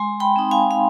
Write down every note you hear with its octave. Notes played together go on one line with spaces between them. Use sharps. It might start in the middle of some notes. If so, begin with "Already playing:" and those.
Already playing: G#3 G#5 C6
G5 B5
C4 D#4
F5 G#5
F5